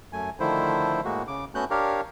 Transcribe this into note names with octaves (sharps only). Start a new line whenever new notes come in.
F#2 A3 G#5
D3 D#3 F3 A3 E4 C5
A2 G#3 A#3 F#4
C#3 D6
A3 B3 C#4 F#4 F#6 G6
D4 G4 A#4 C#5 F5